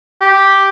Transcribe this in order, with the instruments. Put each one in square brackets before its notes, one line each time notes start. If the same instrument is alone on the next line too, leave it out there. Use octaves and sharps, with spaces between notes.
[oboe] G4